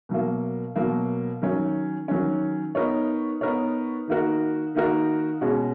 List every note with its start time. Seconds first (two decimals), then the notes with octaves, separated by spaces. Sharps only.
0.09 B2 F#3 A#3
0.76 B2 F#3 A#3
1.42 D#3 F#3 C#4
2.08 D#3 F#3 C#4
2.75 B3 D#4 A#4 C#5
3.41 B3 D#4 A#4 C#5
4.08 D#3 A#3 D#4 F#4 A#4
4.75 D#3 A#3 D#4 F#4 A#4
5.41 B2 G#3 C#4 F#4